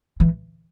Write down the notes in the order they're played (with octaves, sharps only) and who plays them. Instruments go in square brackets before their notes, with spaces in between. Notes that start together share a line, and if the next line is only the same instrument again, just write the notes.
[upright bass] E3